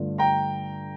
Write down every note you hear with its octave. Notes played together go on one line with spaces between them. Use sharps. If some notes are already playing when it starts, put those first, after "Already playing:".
Already playing: G2 D3 A3 D4 F4
G5 A#5